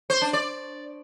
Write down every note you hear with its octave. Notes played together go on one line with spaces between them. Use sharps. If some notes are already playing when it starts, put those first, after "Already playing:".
C5
D4
D5